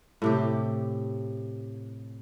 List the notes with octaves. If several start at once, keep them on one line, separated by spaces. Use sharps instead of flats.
A2 C3 G4